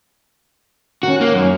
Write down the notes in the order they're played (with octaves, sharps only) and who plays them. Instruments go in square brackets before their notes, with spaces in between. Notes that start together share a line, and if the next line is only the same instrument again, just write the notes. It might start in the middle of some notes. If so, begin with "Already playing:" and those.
[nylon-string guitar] D#3 C#4 [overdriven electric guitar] F#4
[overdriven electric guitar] A#3
F#2